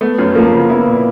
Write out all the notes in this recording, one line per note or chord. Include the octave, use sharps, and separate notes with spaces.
A3 B3
F#2
F3 A#3
C#3
B3 E4
A#2